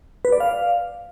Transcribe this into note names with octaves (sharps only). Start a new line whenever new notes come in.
B4
D5
F5